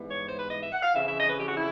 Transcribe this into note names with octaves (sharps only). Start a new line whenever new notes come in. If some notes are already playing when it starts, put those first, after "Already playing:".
Already playing: G#2 E3 G3 B3
C#5
C5
B4
D#5
E5
F#5
F5
F2 C#3 E3 E5
E5
D#5
B4
G4
F#4
E4